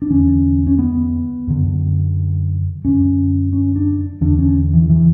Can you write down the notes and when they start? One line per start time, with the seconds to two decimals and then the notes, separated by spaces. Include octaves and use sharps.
0.02 D4
0.10 E2 D3 C#4
0.67 C#4
0.79 B3
1.47 F#2 D3
2.84 F#2 D3 C#4
3.53 C#4
3.76 D4
4.21 E2 D3 D4
4.39 C#4
4.73 E3
4.89 E3